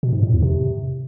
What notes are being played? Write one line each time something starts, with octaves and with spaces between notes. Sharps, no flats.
B2
G#2
A2
E2
C3